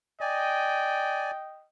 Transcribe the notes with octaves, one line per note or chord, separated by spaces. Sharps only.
D5 D#5 G5 G#5